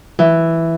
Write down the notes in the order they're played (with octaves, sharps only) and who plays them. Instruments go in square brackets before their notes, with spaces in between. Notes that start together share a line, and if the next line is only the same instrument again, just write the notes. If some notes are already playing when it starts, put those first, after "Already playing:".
[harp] E3